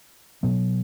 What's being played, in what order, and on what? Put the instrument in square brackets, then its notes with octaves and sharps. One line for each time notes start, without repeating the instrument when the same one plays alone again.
[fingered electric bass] B2 F#3 B3